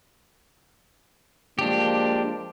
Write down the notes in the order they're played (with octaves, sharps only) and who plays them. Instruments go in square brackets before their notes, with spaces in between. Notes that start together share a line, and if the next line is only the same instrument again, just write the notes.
[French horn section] F3 G#3 A#3 [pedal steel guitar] D4 G4